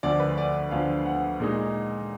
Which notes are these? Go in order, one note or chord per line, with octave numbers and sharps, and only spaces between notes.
D2 D3 F3 D5
B4
D5
D2 D3 F3 F5
F#5
A#2 G#3 D#4